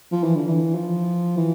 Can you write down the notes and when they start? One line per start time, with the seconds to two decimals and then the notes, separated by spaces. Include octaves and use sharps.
0.12 F3
0.23 E3
0.36 D3
0.48 E3
0.75 F3
1.37 E3